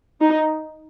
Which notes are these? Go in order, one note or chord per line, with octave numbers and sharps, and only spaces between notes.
D#4